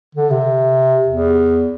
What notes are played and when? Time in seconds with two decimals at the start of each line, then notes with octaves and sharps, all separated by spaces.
0.15 D3
0.30 C3
1.08 E2